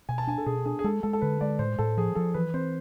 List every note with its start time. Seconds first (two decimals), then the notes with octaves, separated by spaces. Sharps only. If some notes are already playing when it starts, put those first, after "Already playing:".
0.09 B2 G#5
0.18 A5
0.27 D4 G#5
0.38 A4
0.46 B2 G#4
0.65 D4 G#4
0.79 G#4
0.84 G#3 A4
1.03 G#3 A4
1.13 A4
1.22 D3 B4
1.41 G#3 D5
1.59 A2 C5
1.79 A2 A4
1.97 F3 G#4
2.15 F3 A4
2.34 E3 B4
2.54 C4 C5